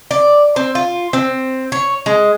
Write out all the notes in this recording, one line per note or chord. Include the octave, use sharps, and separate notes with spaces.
D5
C4
F4
C4
C#5
G#3